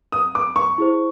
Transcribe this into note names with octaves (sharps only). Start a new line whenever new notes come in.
D#6
D6
C#6
E4 G#4 C5